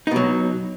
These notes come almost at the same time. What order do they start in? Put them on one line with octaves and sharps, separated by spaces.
D#4 B2 F#3